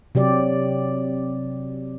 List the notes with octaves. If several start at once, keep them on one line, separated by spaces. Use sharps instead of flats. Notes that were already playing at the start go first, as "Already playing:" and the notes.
C3 F#3 G4 D5